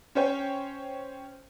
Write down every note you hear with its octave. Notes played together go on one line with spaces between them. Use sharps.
C#4 C5 C#5 G5